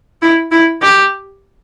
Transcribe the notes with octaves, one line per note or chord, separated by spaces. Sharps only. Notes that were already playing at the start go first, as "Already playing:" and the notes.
E4
E4
G4